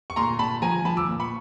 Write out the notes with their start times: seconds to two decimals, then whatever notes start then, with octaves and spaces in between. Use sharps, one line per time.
0.10 C#6
0.16 A#2 A#5 C6
0.39 A#2 A5 B5
0.62 F3 G#5 A#5
0.85 F3 A5 B5
0.97 D6 E6
1.08 A#2
1.20 B5 C#6